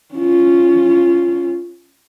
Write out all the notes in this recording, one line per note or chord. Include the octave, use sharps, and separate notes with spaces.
C#4 F4